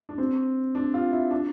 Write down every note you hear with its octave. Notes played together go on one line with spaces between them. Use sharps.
D4
C4
D4
F4
E4
D4